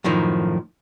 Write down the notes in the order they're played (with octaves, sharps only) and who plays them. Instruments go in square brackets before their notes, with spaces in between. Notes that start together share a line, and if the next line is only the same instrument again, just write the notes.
[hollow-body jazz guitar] F#2 A2 D#3 F3